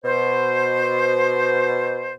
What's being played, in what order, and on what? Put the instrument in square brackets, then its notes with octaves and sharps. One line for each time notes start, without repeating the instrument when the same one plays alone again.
[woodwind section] B2 C5